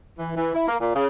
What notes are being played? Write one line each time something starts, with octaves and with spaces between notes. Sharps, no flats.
E3
E3
E4
A#3
A#2
C#3